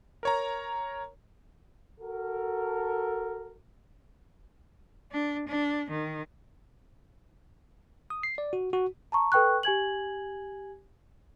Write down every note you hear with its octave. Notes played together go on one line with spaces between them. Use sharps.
A#4 C#5 A#5
F#4 A4 A#4
D4
D4
D#3
D#6
C7
D5
F#4
F#4
A5 A#5 C#6
A4 B4 G5 C#6 F#6
G4 G#5 G#6 F#7